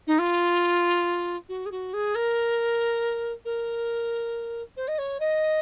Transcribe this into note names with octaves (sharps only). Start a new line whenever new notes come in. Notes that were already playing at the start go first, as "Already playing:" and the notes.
D#4
F4
F#4
G#4
F#4
G#4
A#4
A#4
C5
D#5
C#5
D#5